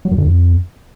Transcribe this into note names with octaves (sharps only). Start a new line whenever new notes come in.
F#3
F#2
D3
F2